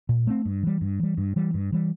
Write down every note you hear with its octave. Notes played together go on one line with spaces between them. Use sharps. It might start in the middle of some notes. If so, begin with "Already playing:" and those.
A#2
A3 C4
G2
E3 G3
G2
E3 G3
G2
E3 G3
G2
E3 G3